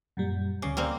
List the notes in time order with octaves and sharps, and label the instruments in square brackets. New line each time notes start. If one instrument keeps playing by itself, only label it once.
[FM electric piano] F#2 A#2 G3
[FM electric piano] D2 D6 [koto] C#3
[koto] G3 A#3 C4